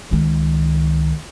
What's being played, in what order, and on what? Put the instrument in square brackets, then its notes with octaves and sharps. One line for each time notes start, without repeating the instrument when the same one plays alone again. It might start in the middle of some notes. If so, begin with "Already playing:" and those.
[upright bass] C#2 D#3